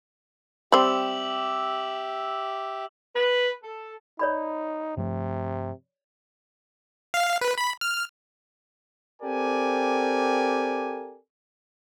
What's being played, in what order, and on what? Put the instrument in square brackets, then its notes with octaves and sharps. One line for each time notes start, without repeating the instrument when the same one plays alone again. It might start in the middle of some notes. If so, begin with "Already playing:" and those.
[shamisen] G3 C4 [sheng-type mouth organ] G4 E5 [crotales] D6 E6 F#7
[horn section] B4
A4
[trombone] D#4 [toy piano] C#5 D5 B5
[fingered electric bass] G2 F3 A3 [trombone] C3
[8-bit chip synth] F5
B4
B5
F6
[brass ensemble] C4 G4 A4 A#4 D5 G#5